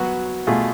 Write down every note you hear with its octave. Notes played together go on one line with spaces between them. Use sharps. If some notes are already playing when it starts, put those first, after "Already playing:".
Already playing: F#3 B3 F#4
B2 A3 F4 G#4